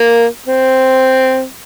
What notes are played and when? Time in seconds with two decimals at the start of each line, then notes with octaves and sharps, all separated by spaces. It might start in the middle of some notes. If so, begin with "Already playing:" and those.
Already playing: A#3
0.46 C4